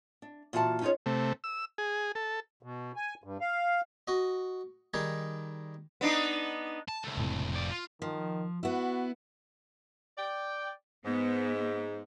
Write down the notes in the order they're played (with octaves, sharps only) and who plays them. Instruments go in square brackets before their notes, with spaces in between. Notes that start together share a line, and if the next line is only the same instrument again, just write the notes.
[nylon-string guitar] D4
A#2 E3 F4 F#4 A5
C#4 D#4 F4 G#4 C#5
[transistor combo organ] C3 A3
E6
G#4
A4
[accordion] B2
G#5
G2
F5
[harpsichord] F#4 D#5
D#3 G3 D#4 G#4
[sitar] B3 D4 D#4
[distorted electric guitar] A5
C#2 A3
[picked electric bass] F1 A2 C3
[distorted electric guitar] F2 D5
F4
[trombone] D#3 [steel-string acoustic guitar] F3
[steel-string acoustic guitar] B3 E4 [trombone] F#4
[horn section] D5 G5
[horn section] G#2 [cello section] B3